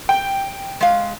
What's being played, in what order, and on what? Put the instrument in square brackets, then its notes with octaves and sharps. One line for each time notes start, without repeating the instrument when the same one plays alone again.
[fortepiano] G5
[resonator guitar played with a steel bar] G#3 F5